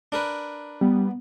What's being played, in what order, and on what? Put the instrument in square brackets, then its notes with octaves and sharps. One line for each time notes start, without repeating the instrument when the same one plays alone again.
[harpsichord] D4 A#4 B4
[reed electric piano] G3 [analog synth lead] B3